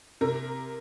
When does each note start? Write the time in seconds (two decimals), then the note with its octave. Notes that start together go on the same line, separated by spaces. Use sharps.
0.21 C3 A#4